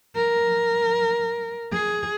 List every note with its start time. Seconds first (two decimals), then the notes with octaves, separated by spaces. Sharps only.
0.16 A#4
1.72 G#4